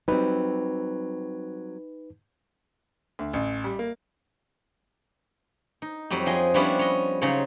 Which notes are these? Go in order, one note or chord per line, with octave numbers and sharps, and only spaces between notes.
F#3 G3 C4 D#4 B4
D2
A1
G3
A#3
D#4
F2 F#3 G3 G4
F3 G#4 D#5 G#5 C6
F3 G3 B3 C#4 D4 E4
C#5 D#5
C#3 F#3 D#4 C5 C#5